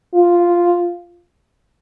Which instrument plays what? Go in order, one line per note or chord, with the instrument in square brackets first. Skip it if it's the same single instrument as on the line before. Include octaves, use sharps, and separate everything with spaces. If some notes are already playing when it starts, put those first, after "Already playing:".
[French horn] F4